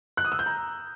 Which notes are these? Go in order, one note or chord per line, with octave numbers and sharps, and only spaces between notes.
F#6
D#6
E6
G6
A#5